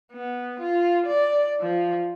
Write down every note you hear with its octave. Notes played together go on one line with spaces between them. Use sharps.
B3
F4
D5
F3